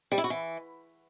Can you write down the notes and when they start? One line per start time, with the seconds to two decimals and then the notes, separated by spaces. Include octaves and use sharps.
0.12 G3
0.18 E4
0.24 F#4
0.30 E3